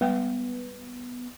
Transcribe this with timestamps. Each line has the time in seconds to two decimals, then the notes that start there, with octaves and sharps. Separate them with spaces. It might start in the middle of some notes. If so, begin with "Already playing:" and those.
0.01 G3 G#3 B3 G5